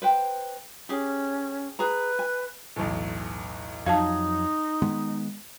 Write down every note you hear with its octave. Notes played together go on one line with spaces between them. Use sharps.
B4 C5 G5
C#4 G4 G#4
G#4 B4 A#5
G#5
B1 E2 A2
F2 F#3 D#4 F5 A5 G#6
D#3 G#3 B3